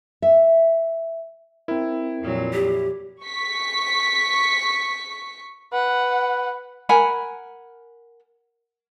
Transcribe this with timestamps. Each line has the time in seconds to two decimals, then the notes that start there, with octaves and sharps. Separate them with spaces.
0.22 E5
1.68 C4 E4 A#4
2.20 F2 A#2 F#3
2.53 G4
3.23 C#6 B6
5.73 B4 F#5
6.89 A#4 F#5 G#5 B5